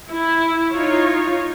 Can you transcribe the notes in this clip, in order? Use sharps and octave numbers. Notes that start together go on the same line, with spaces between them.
E4
D#4 F4 C#5